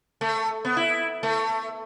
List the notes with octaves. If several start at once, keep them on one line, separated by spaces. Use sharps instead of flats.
A3
B3
E4
A3